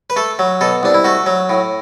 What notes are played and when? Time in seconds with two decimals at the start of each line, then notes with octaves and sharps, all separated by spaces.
0.10 B4
0.16 A3 A4
0.39 F#3
0.61 B2 A4
0.83 C2 D4
0.94 E4
1.04 A3 F#4
1.26 F#3
1.50 A2